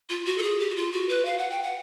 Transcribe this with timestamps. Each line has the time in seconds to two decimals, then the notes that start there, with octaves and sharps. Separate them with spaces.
0.09 F4
0.25 F#4
0.38 A4
0.42 G#4
0.60 G4
0.70 F#4
0.76 F4
0.92 F#4
1.09 B4
1.25 F5
1.38 F#5
1.50 G5
1.63 F#5